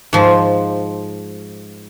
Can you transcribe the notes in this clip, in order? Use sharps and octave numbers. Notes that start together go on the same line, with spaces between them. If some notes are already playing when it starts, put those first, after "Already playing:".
G#2 F3